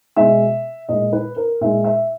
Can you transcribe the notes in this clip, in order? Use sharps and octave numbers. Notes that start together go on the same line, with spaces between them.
B2 G#3 E5
A#2 G#3 D#5
B4
A#4
A#2 G#3 E5
E5